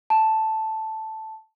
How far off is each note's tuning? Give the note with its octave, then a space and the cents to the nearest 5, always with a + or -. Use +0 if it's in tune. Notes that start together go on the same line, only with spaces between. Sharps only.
A5 +0